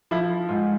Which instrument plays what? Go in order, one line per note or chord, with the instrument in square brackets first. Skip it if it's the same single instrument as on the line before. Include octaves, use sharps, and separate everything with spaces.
[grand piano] F3 E4
G#2 F4